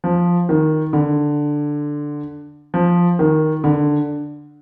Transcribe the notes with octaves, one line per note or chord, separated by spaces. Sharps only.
F3
D#3
D3
F3
D#3
D3